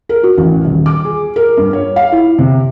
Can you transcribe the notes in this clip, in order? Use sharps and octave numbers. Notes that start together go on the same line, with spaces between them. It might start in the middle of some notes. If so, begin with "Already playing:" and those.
A#4
F#4
A1
D#1
D6
G#4
A#4
G2
C#5
F5
E4
C3